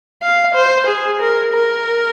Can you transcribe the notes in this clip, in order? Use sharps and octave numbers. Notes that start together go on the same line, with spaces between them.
F5
C5
G#4
A#4
A#4